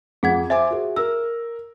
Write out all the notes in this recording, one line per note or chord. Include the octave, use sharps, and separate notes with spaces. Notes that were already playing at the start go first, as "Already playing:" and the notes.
F2 G#4 F#5 G#6
C5 E5 G#5 D6
F#4 G#4
A#4 E6